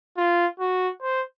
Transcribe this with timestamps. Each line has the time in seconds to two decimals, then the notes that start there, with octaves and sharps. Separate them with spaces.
0.17 F4
0.60 F#4
1.01 C5